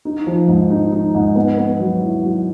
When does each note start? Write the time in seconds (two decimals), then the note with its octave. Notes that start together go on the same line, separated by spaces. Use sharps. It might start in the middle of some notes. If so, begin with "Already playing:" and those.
0.05 D#4
0.27 F3
0.48 G#2
0.70 D#4
0.92 D#4
1.15 G#2
1.36 B3
1.58 B3
1.80 F#3
2.02 E4
2.23 F#3